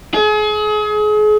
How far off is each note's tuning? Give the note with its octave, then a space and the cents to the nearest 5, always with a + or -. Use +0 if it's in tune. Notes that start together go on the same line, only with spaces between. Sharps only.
G#4 +35